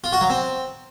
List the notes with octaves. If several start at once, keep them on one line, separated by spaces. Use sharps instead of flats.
F4
F#4
F#3
C4